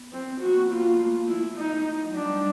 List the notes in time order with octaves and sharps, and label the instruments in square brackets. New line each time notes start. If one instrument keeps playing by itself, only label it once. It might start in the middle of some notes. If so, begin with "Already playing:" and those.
Already playing: [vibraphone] B3
[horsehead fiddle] C4
[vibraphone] A#3 [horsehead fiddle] F#4
[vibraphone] B3
A#3
[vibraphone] B3 [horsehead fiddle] F4
[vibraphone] A#3
A3
[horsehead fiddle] E4
D#4
[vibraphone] F#3
[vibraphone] G3 [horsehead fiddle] D4
[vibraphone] G3